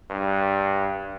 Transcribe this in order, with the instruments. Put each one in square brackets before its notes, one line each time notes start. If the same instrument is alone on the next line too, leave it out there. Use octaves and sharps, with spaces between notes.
[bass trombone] G2